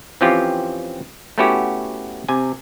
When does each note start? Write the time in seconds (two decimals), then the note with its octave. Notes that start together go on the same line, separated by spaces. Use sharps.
0.21 E3 F3 C4 C#4 F4 G4
1.38 A3 B3 C#4 E4 F#4 G4
2.29 C3 G#5